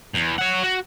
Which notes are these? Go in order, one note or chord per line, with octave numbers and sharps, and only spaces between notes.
E2
C#5 F#5
F#4